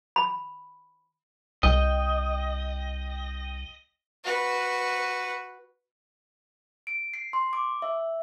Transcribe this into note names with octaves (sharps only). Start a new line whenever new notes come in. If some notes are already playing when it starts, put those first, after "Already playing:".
B5
C2 D#5 G5
F#4 B4
D7
C7
C6
D6
E5